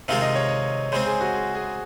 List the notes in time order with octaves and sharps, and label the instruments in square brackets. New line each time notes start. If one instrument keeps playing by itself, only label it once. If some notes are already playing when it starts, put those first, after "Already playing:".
[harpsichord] C3 D#3 G#3 C4 F4 [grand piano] F5
[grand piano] D#5
C#5
D#5
[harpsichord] C#3 G#3 C4 [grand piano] C5
[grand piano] G#4
F#4
G#4
G#4